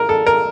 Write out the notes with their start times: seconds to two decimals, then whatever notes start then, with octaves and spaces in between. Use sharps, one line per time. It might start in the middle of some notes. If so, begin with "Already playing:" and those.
Already playing: A#4
0.09 A4
0.27 A#4